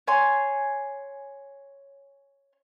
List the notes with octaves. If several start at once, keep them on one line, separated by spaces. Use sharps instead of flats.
C#5 G#5 C6